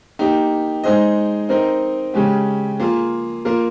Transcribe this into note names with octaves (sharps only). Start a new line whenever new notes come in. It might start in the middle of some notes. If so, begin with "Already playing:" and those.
A#3 D#4 G4
G#3 D#4 G#4 C5 D#5
C4 D#4 A#4 D#5
C#3 G#3 C#4 G4
A#3 F4 G#4
A#3 F4 A#4